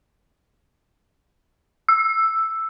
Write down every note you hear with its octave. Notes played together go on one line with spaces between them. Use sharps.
E6